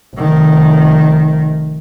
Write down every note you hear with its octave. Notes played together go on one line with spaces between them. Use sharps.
F1 D#3